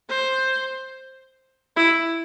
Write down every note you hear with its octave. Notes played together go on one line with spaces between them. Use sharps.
C5
E4